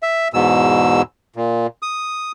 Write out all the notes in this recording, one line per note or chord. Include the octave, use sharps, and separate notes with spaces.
E5
E2 G#2 B2 E6
A#2
D#6